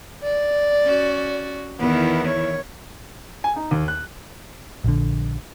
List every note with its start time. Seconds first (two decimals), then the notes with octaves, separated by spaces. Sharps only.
0.24 D5
0.82 C#4 F#4
1.80 E2 D#3 B3 E4
2.27 C#5
3.44 G#5
3.56 D#4
3.71 D#2
3.88 F#6
4.84 A#1 D3